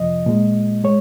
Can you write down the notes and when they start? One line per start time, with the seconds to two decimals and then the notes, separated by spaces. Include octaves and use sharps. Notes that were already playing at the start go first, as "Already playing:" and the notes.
Already playing: F2 C3 F3 D#5
0.26 A#2 G#3
0.84 G#3 C#5